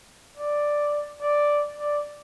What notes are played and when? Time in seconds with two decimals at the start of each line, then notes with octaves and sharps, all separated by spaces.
0.37 D5
1.21 D5
1.78 D5